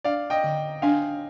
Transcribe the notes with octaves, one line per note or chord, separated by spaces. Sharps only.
D4 D5 F5
D#5 G5
D3
D4 F5 G#5